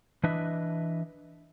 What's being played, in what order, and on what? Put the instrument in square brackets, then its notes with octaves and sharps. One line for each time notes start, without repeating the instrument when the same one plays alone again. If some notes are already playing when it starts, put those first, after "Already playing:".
[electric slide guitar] E3 D4 B4 D#5 E5